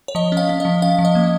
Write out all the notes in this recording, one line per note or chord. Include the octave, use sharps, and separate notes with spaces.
C#5
F3 D#5
C#4
F5
C#4
F3 D#5
C#4 F5
F3
D#5
A#3